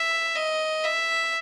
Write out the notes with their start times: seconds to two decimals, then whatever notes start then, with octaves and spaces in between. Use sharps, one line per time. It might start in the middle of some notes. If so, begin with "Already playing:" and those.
Already playing: E5
0.36 D#5
0.84 E5